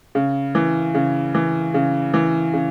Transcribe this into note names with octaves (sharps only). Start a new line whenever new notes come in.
C#3
E3
C#3
E3
C#3
E3
C#3